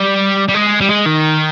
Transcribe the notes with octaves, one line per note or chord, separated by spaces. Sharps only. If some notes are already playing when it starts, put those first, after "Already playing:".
Already playing: G3
G3
G#3
G3
G#3
D#3